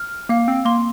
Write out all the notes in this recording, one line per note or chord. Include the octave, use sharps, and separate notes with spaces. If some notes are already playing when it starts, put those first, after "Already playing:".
Already playing: F6
A#3 F5
C4
A#3 C6